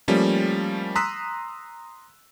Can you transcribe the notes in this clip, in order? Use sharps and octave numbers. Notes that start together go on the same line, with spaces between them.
F3 G3 A3 A#3 C#4
A#5 C6 D#6 E6 F#6 B6